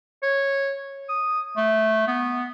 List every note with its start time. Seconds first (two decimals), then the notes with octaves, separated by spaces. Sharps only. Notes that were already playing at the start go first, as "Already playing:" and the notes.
0.23 C#5
1.09 D#6
1.57 A3
2.07 B3